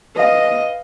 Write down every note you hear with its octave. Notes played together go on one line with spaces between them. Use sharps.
B4 D#5 F5